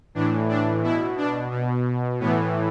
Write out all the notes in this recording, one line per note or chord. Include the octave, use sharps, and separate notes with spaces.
A2 E3 D4
D4
B2 E4
D4
B2
A2 E3 B3